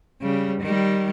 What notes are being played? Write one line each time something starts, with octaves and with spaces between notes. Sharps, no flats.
C#3 G3
D#3 G3